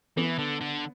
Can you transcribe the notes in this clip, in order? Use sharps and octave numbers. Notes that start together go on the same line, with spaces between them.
E3 B3
D3
D3